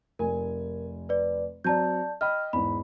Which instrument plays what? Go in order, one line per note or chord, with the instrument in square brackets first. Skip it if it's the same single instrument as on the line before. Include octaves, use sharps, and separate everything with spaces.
[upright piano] F1 G#5 [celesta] A#4
[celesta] B4 D5
[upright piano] F#3 C4 A#5 [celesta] D5 A5 G6
[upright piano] D#5 G5 B5 [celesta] F6
[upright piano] E2 G#2 [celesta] B5